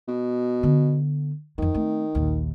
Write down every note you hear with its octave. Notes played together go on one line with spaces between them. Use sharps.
B2
D3 B3
F2 D#3 F4
A3 C4
A#1 D#2